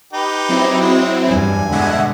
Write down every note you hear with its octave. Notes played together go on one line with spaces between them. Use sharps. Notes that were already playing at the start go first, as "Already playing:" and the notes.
D#4 G4 B4
F#3 C4 E4
G#3
E2 G2 G#5
B2 D3 G#3 E5 F#5